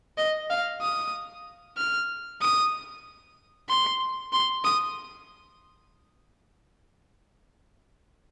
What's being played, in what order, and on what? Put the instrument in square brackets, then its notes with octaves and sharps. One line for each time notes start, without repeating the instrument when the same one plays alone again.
[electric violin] D#5
F5
D#6
F6
D#6
C6
C6
D#6